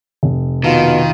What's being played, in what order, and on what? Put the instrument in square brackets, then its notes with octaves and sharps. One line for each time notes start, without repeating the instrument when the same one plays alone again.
[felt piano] F1
[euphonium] B2 [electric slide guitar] D#3 [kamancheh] F4